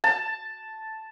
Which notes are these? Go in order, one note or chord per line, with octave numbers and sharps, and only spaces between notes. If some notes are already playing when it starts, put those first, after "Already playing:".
A5